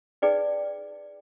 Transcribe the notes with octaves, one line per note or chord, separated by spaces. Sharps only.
D#4 G#4 B4 D5 G5